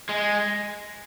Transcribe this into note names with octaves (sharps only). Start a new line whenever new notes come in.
G#3